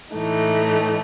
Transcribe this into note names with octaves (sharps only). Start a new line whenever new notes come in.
A2 E3 A3 D#4